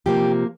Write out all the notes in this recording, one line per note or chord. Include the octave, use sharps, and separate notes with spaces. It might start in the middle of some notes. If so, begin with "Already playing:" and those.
C3 F3 A#3 G4